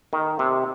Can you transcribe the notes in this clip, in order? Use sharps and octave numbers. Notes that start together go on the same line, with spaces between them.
D#3
C3